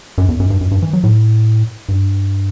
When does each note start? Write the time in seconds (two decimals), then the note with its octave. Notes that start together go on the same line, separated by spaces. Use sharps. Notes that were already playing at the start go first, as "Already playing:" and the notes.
0.18 F#2
0.28 E2
0.40 F#2
0.50 G2
0.61 F#2
0.71 G2
0.82 E3
0.93 F#3
1.04 A2
1.89 G2